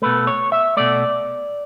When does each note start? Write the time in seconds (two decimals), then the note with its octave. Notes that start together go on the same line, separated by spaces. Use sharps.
0.02 B2 A3 B4
0.27 C#5
0.52 E5
0.77 B2 A3 D5